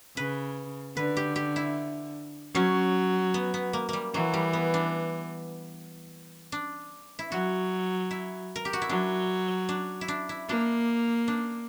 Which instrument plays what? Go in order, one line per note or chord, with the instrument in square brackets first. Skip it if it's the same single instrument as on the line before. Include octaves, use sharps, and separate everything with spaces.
[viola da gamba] C#3 [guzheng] B4
[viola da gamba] D3 [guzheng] B4
[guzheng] G4
G4
E4
[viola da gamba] F#3 [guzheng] C#4
[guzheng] B3
B3
A#3
G3 A#3
[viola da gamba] E3 [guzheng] F#3
[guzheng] G3
B3
D4
D4
E4
[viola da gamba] F#3 [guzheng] F#4
[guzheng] E4
A#4
G4
F#4
E4
[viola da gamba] F#3 [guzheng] D4
[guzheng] D4
E4
D4
E4
[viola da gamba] A#3 [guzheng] D4
[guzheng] D4